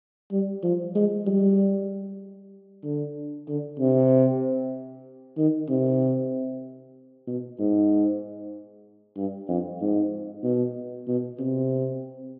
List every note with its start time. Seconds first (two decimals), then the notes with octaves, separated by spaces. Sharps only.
0.32 G3
0.63 F3
0.95 G#3
1.27 G3
2.84 D3
3.48 D3
3.80 C3
5.38 D#3
5.69 C3
7.27 B2
7.59 G#2
9.17 G2
9.48 F2
9.81 G#2
10.44 B2
11.08 B2
11.39 C3